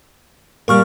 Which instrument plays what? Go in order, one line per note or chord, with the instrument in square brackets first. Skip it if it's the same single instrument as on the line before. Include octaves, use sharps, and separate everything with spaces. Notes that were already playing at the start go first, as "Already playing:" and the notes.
[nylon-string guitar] A#2 G3 G#3 [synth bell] A#4 C#6 F6